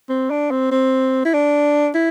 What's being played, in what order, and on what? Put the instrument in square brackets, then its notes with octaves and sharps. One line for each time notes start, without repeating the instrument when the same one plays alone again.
[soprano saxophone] C4
D4
C4
C4
E4
D4
E4